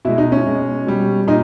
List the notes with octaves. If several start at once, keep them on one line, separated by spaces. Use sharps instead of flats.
B2 G#3 E4
D#4
C#4
B2 G#3
B2 G3
A#2 D#4